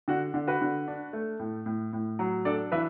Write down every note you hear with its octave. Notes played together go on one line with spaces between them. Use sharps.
D3 F#4
D3
F#4 B4
D3
D4
A3
A2
A2
A2
F#3
D4 A4 D5
E3 B4 E5